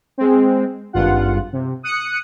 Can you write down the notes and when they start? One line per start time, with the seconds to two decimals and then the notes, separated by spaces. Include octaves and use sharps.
0.18 G#3 C4
0.93 G#1 G2 F4 F#5
1.53 C3
1.83 D#6 F#6 C#7